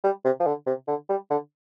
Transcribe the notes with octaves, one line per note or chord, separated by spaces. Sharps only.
G3
C3
F3
D3
C3
D3
G3
D3